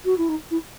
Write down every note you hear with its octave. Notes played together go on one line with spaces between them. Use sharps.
F#4
E4
D#4
E4